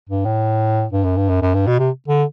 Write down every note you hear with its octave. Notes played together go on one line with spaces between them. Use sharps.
G2
A2
G2
F#2
G2
F#2
F#2
G2
B2
C3
D3